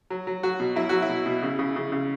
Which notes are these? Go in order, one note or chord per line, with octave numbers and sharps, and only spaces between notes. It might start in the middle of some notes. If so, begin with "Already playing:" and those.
F#3
F#3
F#3 F#4
B2
F#3 E4
F#3 F#4
E4
B2
B2
C#3
C#3
C#3
C#3